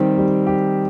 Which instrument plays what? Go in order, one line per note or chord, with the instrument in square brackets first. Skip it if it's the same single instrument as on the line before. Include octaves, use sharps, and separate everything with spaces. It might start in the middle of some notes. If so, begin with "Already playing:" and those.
Already playing: [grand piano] D#3 G3 C4 G4
G3
G4